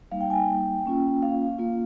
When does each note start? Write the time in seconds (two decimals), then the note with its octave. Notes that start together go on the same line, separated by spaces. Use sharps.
0.12 G3 A#3 D#4 F5
0.21 G5
0.30 G#5
0.39 G5
0.86 A#3 C#4 F4
1.23 F5
1.59 A#3 F4